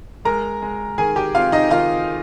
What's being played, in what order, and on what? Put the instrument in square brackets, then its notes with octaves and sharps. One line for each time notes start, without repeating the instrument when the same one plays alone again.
[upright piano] G#3 A#4 A#5
G#3
D#3 G#4 G#5
G4 G5
C4 F4 F5
D#4 D#5
D#3 F4 F5